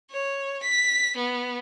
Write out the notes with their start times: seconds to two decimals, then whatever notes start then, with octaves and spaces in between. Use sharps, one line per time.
0.10 C#5
0.62 B6
1.16 B3